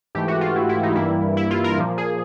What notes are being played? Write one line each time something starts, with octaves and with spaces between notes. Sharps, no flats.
G#2 E3 A3 G4
F#4
F4
E4
E4
D#4
G2 E3 G3 A#3 E4
E4
F4
A#4
A#2 F3 A#3
G#4